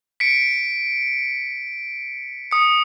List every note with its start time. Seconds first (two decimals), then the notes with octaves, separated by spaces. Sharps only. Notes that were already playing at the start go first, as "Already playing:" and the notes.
0.20 B6 C#7 D7
2.51 D#6 C#7